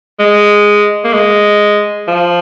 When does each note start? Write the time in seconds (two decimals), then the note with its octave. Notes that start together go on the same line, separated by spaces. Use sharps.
0.20 G#3
1.04 A#3
1.14 G#3
2.08 F3